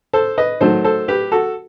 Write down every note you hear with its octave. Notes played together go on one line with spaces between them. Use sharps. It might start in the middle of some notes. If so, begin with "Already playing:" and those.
A4 C5
B4 D#5
D#3 F#3 A3 A4 C5
A4 C5
G4 B4
F#4 A4